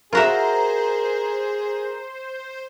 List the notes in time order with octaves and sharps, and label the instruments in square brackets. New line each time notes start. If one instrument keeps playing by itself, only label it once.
[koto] F4 F#4 E5 [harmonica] G#4 [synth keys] A#4 A#5 [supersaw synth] C5